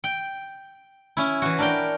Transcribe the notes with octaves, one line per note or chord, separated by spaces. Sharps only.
G5
C#4 E4
E3 F#4
D4 A#4 G5